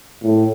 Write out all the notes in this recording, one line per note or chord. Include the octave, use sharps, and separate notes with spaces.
A2